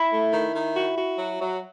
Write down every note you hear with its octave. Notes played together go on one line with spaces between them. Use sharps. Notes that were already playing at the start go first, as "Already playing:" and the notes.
Already playing: E4
A3
D#3
D#3
F#4
F#4
F#3
F#3